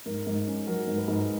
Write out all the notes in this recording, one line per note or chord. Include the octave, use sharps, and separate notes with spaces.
G#2 A#4
G#2
C#4
F#3 A#4
G#2
B4
G#2